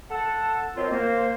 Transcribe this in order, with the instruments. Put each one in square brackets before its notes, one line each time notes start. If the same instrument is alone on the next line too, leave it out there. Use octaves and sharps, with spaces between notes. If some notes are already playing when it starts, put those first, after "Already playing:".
[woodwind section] A4 F#5 A5
F#3 C4 F4 A#4 C5 D#5
A#3 C5